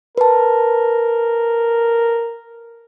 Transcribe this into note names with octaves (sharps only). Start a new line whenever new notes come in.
A#4 B4 A5